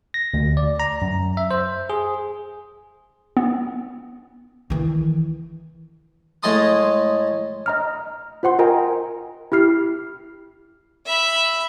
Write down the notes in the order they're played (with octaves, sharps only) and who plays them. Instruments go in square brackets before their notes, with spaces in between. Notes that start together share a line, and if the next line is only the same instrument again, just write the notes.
[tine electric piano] A#6
D2
D5
A#5
F#2
E5
C5
G#4
[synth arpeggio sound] B3
[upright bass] D#3 E3
[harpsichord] A2 G#3 A5 C6 D#6
[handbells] D#5 A#5 F6
F4 C5 F#5 C6
F4 A#4 D#5 G5 G#5 A#5
E4 G4 F6 C7
[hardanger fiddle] E5 B5